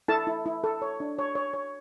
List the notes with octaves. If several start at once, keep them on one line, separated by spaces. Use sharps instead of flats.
E4 A4 A5
E4
E4
A4
C#5
D4
C#5
C#5
C#5